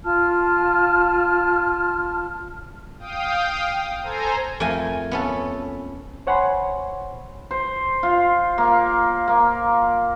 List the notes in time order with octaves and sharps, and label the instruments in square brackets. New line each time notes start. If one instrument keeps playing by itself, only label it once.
[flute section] F4 A5 F6
[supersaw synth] F5 G5 D#6
A4 C5 G#5 A#5
[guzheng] F2 A3 A#4 G5 G#5
B3 C#4 A4
[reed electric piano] C5 C#5 F#5 G#5 B5 C6
[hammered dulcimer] C5
F4
A#3
A#3